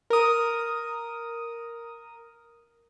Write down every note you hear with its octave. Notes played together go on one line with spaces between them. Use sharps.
A#4 D#6